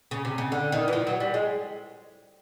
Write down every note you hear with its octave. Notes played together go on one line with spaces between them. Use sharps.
C#3
C3
C#3
D3
D#3
E3
F3
F#3
G3
G#3